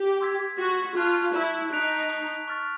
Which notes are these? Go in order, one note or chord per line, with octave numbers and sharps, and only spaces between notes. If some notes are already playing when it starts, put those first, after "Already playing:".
Already playing: G4
C6 E6 G#6 B6
F#4
F4 A5 C#6 F#6
E4
D#4 F#6 B6 D7 F7
C#6 F6 A6